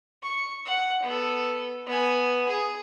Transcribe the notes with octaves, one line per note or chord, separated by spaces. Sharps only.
C#6
F#5
B3 A4
B3 G#5
G#4